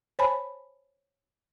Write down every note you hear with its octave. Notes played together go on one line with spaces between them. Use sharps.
C5 C#5 G#5 A5 B5